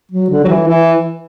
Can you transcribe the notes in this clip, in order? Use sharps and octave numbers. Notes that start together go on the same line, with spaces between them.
F#3
D3
F#3
E3
E3